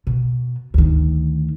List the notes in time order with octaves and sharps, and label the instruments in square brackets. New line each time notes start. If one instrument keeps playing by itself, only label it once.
[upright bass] B2
D2 D#3